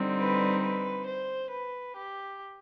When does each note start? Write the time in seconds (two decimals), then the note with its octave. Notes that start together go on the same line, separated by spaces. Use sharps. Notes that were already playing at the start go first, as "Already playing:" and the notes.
Already playing: D3 G3 C4 D#4
0.18 B4
0.63 B4
1.06 C5
1.52 B4
1.96 G4